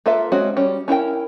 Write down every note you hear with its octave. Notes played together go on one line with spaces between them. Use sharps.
A#3 F4 A4 B4 E5
G#3 C4 C#4 F#4
G3 C#4
C#4 E4 A#4 G5